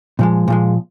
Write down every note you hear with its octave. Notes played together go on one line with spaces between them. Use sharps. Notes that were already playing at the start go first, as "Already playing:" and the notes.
A#2 F3 G#3
A#2 F3 G#3